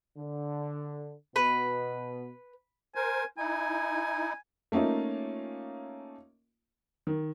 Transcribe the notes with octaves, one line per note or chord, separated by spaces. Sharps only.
D3
B2 B3 B4
A#4 C5 G#5
D#4 E4 G#5
A3 A#3 C#4 D#4 F4
D#3